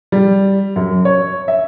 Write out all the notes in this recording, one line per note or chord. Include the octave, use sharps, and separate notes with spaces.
G3
F#2
C#5
E5